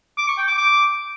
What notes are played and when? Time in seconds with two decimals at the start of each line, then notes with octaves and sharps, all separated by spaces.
0.18 D6
0.28 C#6
0.38 G5
0.48 D6
0.58 D6